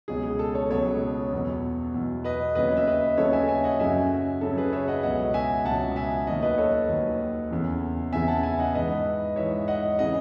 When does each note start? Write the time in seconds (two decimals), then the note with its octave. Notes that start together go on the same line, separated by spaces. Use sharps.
0.08 C#2 B2 F#3 G#4
0.23 G#4
0.39 A4
0.55 A4 C#5
0.70 C#2 B2 F#3 A4 C#5
1.32 E2 B2 F#3
1.94 E2 B2 F#3
2.24 B4 D#5
2.55 D#2 C#3 F#3 B4 D#5
2.77 E5
2.87 B4 D#5
3.17 D#2 C#3 F#3 A4 C#5
3.33 E5 G#5
3.48 E5 G#5
3.64 D#5 F#5
3.79 F#2 C#3 F#3 E5 G#5
4.41 F#2 C#3 F#3 A4
4.58 G#4 B4
4.73 C#5 E5
4.88 D#5 F#5
5.03 C#2 B2 F#3 D#5 F#5
5.34 E5 G#5
5.65 C#2 B2 F#3 F#5 A5
5.96 E5 G#5
6.27 D#2 D#3 F#3 D#5 F#5
6.43 B4 D#5
6.58 A4 C#5
6.89 D#2 D#3 F#3
7.51 E2 C#3 E3
8.12 E2 C#3 E3 E5 G#5
8.28 F#5 A5
8.43 E5 G#5
8.59 D#5 F#5
8.75 G#2 E3 B4 D#5
9.36 G#2 E3 C#5 E5
9.68 D#5 F#5
9.98 C#3 E3 D#5 F#5